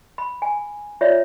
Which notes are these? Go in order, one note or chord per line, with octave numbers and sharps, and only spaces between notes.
B5
G#5
F4 C#5 D5 E5